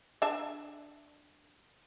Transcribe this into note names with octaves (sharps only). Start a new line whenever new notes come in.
D4 E5 A5